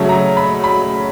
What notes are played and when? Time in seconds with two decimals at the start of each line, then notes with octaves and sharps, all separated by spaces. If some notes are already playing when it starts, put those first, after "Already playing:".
Already playing: C#3 F#3 A3 C#4
0.09 A#5
0.37 B5
0.64 B5